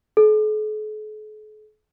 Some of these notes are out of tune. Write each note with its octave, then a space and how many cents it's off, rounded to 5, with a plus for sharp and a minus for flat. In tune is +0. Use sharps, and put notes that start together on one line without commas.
A4 -45